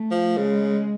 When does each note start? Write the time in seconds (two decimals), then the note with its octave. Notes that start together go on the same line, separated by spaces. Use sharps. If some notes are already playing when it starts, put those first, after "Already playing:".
Already playing: A3
0.11 F3
0.36 C#3 G#3